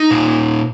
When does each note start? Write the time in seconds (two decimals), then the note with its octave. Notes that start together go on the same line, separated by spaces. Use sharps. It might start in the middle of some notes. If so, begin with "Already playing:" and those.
Already playing: D#4
0.11 A#2